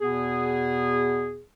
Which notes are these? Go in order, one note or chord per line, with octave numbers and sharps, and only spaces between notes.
E2 B2 B3 G#4